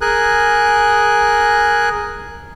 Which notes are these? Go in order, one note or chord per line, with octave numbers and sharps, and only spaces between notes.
G#4 A#4 G#5 F#6